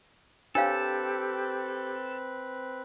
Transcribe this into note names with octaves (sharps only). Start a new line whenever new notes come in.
C4 D4 G4 A4 B4 C#5 F5